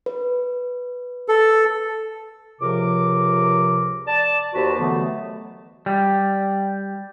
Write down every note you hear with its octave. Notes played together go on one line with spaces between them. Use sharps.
B4
A4
C#2 C3 F3 A#4 D6
D5 A5
D#2 F#4 G4 B4 C5 A5
B2 D3 E3 F#3 A3 B3
G3